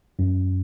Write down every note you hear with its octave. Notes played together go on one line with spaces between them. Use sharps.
F#2